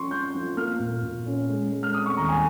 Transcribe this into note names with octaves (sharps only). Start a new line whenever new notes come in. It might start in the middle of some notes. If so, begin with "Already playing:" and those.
Already playing: F3 C#4 C6 C#6
C#4 G6
F3
A#3 F6
A#2
A#2
C#4
G#3
G#3
F6
C4 D#6
C#6
D#2 A#5
G#5